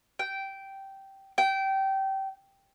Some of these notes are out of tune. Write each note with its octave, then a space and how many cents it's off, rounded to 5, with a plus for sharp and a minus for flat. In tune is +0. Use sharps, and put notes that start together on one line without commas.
G5 -10
G5 -20